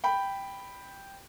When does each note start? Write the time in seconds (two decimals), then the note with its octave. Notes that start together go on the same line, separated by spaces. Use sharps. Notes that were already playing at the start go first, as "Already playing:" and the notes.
0.04 G5 B5